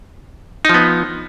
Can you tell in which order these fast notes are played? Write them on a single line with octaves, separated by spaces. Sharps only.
D#4 F3 B3